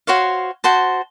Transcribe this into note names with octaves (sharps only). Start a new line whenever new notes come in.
F#4 C5 C#5 F5
F#4 C5 A5